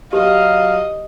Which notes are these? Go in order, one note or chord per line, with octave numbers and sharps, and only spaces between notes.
F#3 G4 B4 D#5 F5